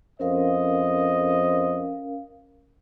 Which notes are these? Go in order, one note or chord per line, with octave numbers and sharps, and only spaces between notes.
F2 C#4 A#4 C5 D#5 F5